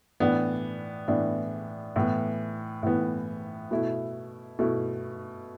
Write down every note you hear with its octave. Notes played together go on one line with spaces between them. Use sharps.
A2 E3 B3 D4
A2 E3 B3 D4
A2 E3 B3
A2 E3 B3
B2 A3 E4
B2 A3 E4